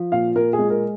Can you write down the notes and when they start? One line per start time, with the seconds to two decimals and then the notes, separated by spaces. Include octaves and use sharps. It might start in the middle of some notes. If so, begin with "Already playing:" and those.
Already playing: F3
0.12 A#2 F5
0.36 A#2 A#4
0.53 G#4
0.59 G#3
0.70 A#4